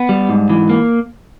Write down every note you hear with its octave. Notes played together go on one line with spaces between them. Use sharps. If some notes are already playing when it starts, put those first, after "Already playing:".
Already playing: B3
G3
G#2
E3
A#3